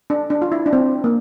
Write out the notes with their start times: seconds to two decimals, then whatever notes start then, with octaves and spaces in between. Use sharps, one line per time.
0.10 D4
0.30 D4
0.42 F4
0.52 E4
0.66 D4
0.73 C4
1.04 A#3